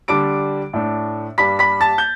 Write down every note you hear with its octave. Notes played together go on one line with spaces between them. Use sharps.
D3 G3 D4 D6 D7
A2 A3 D4
G2 G3 D4 B5 B6
B5 B6
A5 A6
G6